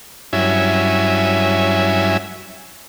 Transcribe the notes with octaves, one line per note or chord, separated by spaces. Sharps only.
G2 F#3 C#4 E4 E5 G#5